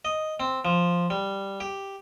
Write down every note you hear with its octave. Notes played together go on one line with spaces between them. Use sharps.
D#5
C4
F3
G3
G4